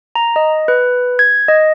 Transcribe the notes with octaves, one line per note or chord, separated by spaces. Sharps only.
A#5
D#5
B4
G#6
D#5